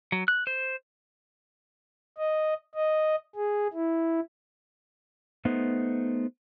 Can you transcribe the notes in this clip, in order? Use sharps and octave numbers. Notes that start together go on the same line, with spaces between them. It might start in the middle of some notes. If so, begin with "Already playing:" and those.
F#3
F#6
C5
D#5
D#5
G#4
E4
A3 B3 D#4 C5